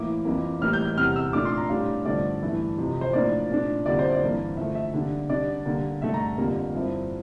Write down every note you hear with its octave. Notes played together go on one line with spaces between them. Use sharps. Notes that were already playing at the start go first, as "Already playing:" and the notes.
Already playing: A2 E3 A#3 E4 D6
F2 E3 A#3
A2 E3 G3 A#3 F6
G6
G6
E2 C3 G3 F6
E6
A#2 A3 D4 D6
C6
A#5
A2 G3 D4 F5
G2 D3 F3 A3 D5
G2 E3 A3 E4
F2 C3 F3
C5
A2 F3 A#3 D4 D5
A#2 A3 D4
F2 D3 G3 A#3 E4 D5
C5
D5
G2 E3 A#3
D3 F3 A3 E5
E5
D3 G3 A#3 D4
D3 G3 D4 D5
D3 G3 A#3
G2 D3 A3 E5
A#5
F2 D3 G3 A#3
G2 F3 C4 E4